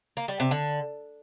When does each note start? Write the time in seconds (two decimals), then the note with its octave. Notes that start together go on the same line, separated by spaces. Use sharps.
0.17 A#3
0.28 G3
0.40 C3
0.51 D3